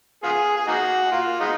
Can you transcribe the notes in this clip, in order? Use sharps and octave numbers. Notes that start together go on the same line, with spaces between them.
B3 F4 G#4
G#4
A#3 D#4 F#4
A#3 F4
G#3 B3 D#4